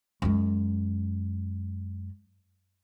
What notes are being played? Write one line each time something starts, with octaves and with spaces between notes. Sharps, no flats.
F#2 G#3